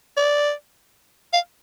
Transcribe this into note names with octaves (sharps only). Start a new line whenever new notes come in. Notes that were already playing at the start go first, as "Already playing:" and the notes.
D5
F5